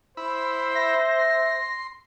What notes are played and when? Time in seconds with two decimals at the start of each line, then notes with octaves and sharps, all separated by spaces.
0.17 E4 C5 B5
0.75 E5 A#6
1.19 C6